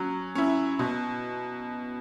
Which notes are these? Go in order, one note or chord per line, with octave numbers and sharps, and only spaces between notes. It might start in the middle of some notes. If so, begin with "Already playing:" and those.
Already playing: F#3 C#4
C#4 E4
B2